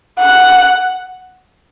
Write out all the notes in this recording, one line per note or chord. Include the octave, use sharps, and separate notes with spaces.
F#5